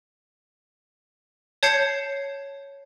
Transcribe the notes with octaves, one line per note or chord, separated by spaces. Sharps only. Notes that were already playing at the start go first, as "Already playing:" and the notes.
C#5 A5 G6 G#6 C7 C#7